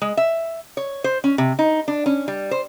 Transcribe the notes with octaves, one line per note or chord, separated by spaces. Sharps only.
G#3
E5
C#5
C5
C#4
C3
D#4
D4
C#4
G3
C5